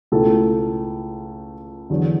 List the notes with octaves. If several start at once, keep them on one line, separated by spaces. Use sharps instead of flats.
C#2 B2 A3 E4 A4
E2 D3 F#3